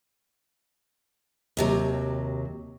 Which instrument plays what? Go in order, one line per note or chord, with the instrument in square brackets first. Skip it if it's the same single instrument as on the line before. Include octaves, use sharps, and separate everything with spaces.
[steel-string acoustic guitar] D#2 C3 F#3